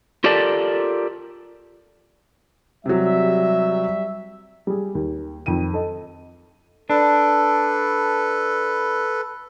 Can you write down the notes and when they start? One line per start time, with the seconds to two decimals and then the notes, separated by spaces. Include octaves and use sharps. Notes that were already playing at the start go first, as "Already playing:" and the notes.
0.24 F4 G4 A4 A#4 D5 A5
2.86 C3 F#3 G3 E5
4.67 G3 G#4
4.95 D#2
5.46 F2 D#3 G5 D#7
5.74 A4 D#5
6.90 D4 A4 B4